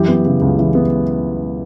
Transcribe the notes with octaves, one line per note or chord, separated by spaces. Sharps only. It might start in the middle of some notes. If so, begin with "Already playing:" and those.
Already playing: F#2 E3 G4
B3
C#3
C#2
E3
B3